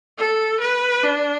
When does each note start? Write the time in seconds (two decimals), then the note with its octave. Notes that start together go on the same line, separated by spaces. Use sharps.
0.18 A4
0.61 B4
1.04 D4